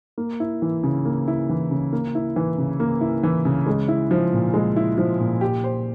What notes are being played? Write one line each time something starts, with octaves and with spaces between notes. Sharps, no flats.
A#3
E4
E3
C#3
A#3
E4
E3
C#3
A#3
E4
E3
C#3
A#3
E4
E3
C#3
G#3
E4
F3
A#2
G#3
E4
F3
A#2
G4
C5